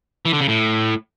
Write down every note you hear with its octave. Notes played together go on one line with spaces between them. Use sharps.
E3
D3
C#3
A2